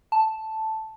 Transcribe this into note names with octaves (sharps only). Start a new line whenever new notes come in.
A5